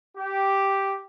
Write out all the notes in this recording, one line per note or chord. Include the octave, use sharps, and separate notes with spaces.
G4